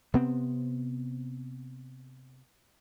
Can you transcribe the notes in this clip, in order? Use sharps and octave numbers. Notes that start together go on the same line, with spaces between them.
C3 B3 C4